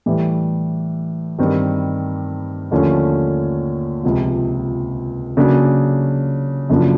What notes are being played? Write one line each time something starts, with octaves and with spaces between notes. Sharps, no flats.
A2 E3 G3
G2 D#3 G3 C4
D#2 D3 F3 A3 C#4
C#2 C3 F3
C#3 F#3 A#3 D4
F#2 C#3 F3 A#3 D4